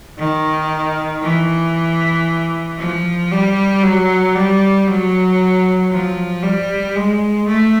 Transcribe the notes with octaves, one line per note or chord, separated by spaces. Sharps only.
D#3
E3
F3
G3
F#3
G3
F#3
F3
G3
G#3
A3